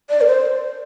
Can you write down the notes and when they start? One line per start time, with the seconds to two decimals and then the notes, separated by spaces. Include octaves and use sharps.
0.10 D5
0.21 A#4
0.27 C5